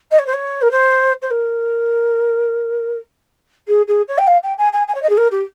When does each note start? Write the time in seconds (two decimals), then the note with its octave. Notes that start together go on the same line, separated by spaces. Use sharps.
0.11 D#5
0.18 C#5
0.26 C5
0.33 C#5
0.61 A#4
0.71 C5
1.22 C5
1.30 A#4
3.68 G#4
3.87 G#4
4.08 C#5
4.18 G5
4.27 F5
4.43 G5
4.58 G#5
4.72 G#5
4.87 G#5
4.94 C#5
5.02 D#5
5.09 G#4
5.17 A#4
5.31 G4